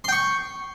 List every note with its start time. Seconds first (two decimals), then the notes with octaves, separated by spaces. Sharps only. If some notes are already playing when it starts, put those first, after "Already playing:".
0.04 C6
0.08 G5
0.12 C#6